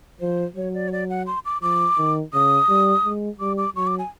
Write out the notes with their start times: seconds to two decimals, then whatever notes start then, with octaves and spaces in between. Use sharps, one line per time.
0.20 F3 C5
0.56 F#3 C#5
0.74 D5
0.88 C#5
0.92 D5
1.10 F#5
1.27 C6
1.45 D6
1.62 F3 D6
1.98 D#3
2.34 C#3 D#6
2.69 G3
3.05 G#3
3.40 G3 D6
3.58 D6
3.76 F#3 C#6
3.87 D6
3.99 G#5